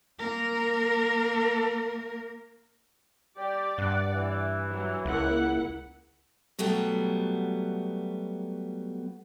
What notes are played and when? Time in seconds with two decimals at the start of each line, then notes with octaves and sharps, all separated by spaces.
0.19 A#3 A#4
3.37 G3 G4 D5
3.78 G2 F#5
4.13 E3
4.67 F#3
5.05 C#2 A#3 E4 F#5
6.59 B2 F#3 G3 A3 B3